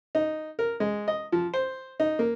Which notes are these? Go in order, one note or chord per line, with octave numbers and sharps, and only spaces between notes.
D#4
A#4
G#3
D#5
F3
C5
D#4
A#3